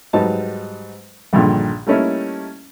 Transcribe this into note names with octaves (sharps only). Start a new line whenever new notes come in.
G#2 F#3 G3 D#4 B4 A5
A#1 G2 A#2 D3 D#3 G#4
G3 A3 A#3 C#4 D#4 E4